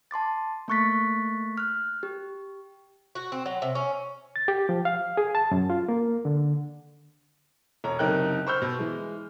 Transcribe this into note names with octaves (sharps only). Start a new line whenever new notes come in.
A5 C6 D6 A6
A3 A#3 C#6 F#6 A6 B6
F6 F#6
G4
F#4
C4
F#3
C3
C#4
A6
G4
F3
F5
G#4
A5
F#2
F4
A#3
D3
E1 C#5 A#5
F#1 C3 D#4 A#4 G5 F#6
C5 B5 C#6 E6 F6 G6
B2
E3 G#3